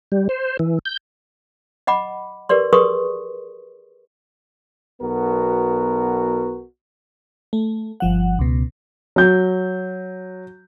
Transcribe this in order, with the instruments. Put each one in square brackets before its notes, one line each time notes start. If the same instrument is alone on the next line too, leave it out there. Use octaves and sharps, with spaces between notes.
[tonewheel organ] G3
C5
E3
G6
[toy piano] D#5 F#5 B5 D6
G4 A#4 B4 D5 C6
G#4 A#4 B4 C6 C#6 D#6
[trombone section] B1 B3 F#4 A#4
[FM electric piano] A3
G1 F3 F#5
C#2 B2
[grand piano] F#3 G6